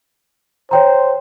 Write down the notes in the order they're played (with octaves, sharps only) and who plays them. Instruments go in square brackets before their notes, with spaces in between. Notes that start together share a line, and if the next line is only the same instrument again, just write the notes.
[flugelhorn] C5 [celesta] C#5 G5 A#5